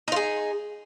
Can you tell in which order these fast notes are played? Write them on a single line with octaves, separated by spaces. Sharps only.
D#4 F4 G#4